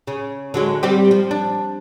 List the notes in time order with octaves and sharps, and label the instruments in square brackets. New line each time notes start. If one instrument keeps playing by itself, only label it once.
[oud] C#3
D3 F#3 G#3
G3 C4 G4
F3
D4